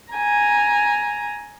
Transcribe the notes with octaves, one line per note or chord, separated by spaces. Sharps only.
G#5 A#5